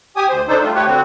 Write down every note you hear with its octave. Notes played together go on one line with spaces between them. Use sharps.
G4 G#5 D#6
D2 C5
D4 D#4 A4 C5
G3 A3 F4
A3 G4 B4 C#5
D3 C4 F#4